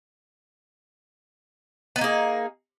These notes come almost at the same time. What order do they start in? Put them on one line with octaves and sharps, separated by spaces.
B3 D#4 A#3 G#4